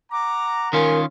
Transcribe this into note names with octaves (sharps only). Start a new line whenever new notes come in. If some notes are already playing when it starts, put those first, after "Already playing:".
F#5 A#5 D6
D#3 C#4 F4 A#4 G#5